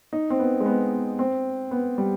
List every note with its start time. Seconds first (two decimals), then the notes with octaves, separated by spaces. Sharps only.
0.13 D#4
0.30 C4
0.39 B3
0.60 G#3
0.66 B3
1.19 C4
1.71 B3
1.98 G3